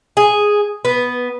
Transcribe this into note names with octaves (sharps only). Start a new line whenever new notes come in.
G#4
B3